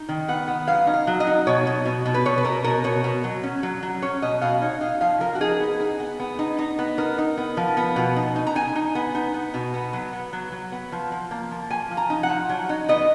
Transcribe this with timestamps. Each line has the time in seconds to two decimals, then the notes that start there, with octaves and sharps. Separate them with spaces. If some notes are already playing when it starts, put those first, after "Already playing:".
Already playing: D#4
0.09 D#3
0.28 B3 F#5
0.48 B3
0.67 F#3 F5
0.87 D#4
0.94 F5
1.07 F#3
1.20 D#5
1.27 D#4
1.47 B2 C#5
1.67 B2
1.85 B2
2.06 B2
2.14 B4
2.25 B2 C#5
2.38 B4
2.44 B2 A#4
2.64 B2 A#4
2.84 B2 C#5
3.04 B2
3.24 F#3
3.43 C#4
3.63 F#3
3.83 F#3
4.02 C#4 C#5
4.22 B2 D#5
4.41 B2 F5
4.61 D#4 C#5
4.81 D#4 F5
5.01 F3 F5
5.20 F3 A#4
5.35 F#4
5.40 D#4 G#4
5.60 B3
5.80 D#4
6.00 B3
6.20 B3
6.39 D#4
6.59 D#4
6.79 B3
6.98 D#4 A#4
7.18 D#4
7.37 B3
7.57 F3
7.77 B3
7.96 B2
8.16 D#4
8.36 D#4
8.47 A#5
8.55 D#4 G#5
8.75 D#4
8.95 B3
9.15 D#4
9.34 B3
9.54 B2
9.74 B3
9.93 F#3
10.13 B3
10.33 F#3
10.52 F#3
10.72 B3
10.92 F3
11.12 F3
11.31 A#3
11.51 F3
11.71 F3 G#5
11.91 F3
11.97 A#5
12.10 D#4
12.23 F#5
12.29 F3
12.49 F#3
12.69 D#4
12.89 B3 D#5